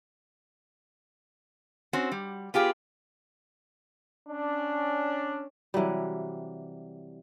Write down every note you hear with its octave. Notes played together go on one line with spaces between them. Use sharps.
C4 C#4 F#4
G3
B3 F4 G4 G#4
C#4 D4
C3 E3 F#3 G3